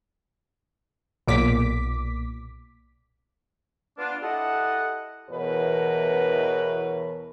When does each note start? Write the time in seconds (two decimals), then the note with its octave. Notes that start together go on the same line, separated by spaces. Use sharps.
1.28 B1 A#2 D6 B6
3.98 B3 D4 F4
4.23 E4 G4 A4 D#5 F#5
5.29 E2 B2 E3 A#4 B4 C#5